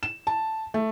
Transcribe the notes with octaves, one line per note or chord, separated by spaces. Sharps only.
E7
A5
A3